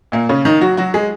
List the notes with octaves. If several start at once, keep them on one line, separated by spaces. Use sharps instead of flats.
A#2 A#3
C#3 C#4
D#3 D#4
F#3 F#4
F#3 F#4
G#3 G#4